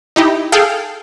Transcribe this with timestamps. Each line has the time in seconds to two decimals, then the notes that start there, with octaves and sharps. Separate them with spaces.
0.16 D#4 E4 G4
0.52 G#4 A4 F5 G5